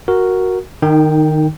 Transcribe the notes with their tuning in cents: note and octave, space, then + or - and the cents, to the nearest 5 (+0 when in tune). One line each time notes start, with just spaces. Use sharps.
F#4 +0 A#4 +0
D#3 -20 D#4 +5 G5 +0